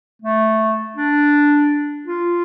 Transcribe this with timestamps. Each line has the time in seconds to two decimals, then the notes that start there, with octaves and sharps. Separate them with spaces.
0.22 A3
0.96 D4
2.08 F4